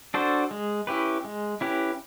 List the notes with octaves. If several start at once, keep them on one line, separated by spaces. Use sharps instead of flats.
D4 F#4 A4 C5
G#3
C#4 E4 G4 B4
G#3
C#4 E4 G4 B4